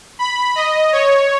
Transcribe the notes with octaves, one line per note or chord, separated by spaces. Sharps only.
B5
D#5
C#5